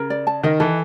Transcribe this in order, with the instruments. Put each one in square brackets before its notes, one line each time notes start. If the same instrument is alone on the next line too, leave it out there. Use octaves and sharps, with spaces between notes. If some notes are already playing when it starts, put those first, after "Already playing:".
Already playing: [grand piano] C#3 [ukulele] A#4
[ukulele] D5
A5
[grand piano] D#3 [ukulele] D#5
[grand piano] E3 [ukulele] A4